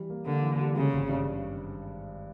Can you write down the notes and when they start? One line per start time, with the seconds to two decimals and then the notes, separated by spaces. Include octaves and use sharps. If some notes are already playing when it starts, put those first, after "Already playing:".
Already playing: E3 G3
0.10 A#3
0.26 D3 A#3
0.43 E3
0.60 G3
0.75 C#3 G#3
0.93 G#1
1.08 G2